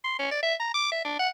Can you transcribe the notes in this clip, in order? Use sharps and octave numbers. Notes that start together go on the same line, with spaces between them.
C6
C#4
D5
E5
A#5
D6
E5
D4
F#5